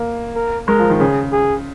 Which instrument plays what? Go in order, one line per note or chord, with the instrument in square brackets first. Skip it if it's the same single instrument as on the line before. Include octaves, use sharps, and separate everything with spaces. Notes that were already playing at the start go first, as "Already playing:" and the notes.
Already playing: [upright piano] A#3
[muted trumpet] A#4
[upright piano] G#3 [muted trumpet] A#4
[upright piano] F3
D#3
[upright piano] C#3 [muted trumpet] G#4
[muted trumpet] G#4